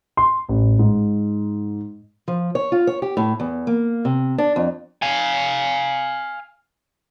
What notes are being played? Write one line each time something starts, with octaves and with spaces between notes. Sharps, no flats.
C6
A1
G#2
F3
C#5
F4
C#5
G4
A2
E2
A#3
C3
D4
F2
F5 G#5